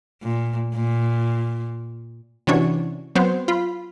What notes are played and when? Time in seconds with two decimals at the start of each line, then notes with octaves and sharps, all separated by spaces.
0.23 A#2
0.75 A#2
2.47 C3 E3 C#4 D4 F#4 C#5
3.15 F#3 B3 C4 C5
3.48 F4 B5